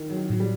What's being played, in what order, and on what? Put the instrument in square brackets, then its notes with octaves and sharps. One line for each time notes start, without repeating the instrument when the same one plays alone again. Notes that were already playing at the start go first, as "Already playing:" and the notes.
Already playing: [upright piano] D#3
F#3
D#3
[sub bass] A2 [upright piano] F#3
[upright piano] G3